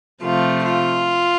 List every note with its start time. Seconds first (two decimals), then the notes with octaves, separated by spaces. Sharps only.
0.22 C3 F3 A3 F4
0.65 F4